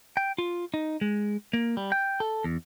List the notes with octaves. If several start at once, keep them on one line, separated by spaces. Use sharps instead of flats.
G5
F4
D#4
G#3
A#3
G3
G5
A4
E2